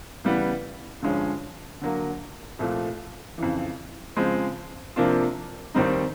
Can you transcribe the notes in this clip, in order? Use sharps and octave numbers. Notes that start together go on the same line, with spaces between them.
C#3 E3 G3 B3
G2 D3 F3 G#3 C#4
D3 F#3 A#3
C2 A#2 F3 A3
F2 C#3 E3
C#3 F3 G#3 C4
C3 F3 A#3 D4 F4
D#2 D#3 G3 C4 D#4